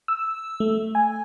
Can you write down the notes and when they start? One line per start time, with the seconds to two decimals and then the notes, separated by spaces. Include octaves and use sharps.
0.08 E6
0.60 A3
0.95 G#5